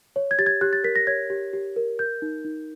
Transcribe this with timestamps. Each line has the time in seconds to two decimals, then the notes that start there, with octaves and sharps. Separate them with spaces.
0.16 C#5
0.31 G#6
0.39 G4 A6
0.46 G#6
0.61 G4 F#6
0.73 A6
0.84 A#4 B6
0.96 A#6
1.07 C#5 G#6
1.30 G4
1.53 G4
1.76 A#4
1.99 A#4 G6
2.22 D#4
2.44 D#4